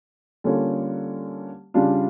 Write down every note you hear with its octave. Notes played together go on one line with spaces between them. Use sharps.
D3 G3 A#3 C#4 F4
C#3 G3 D4 F4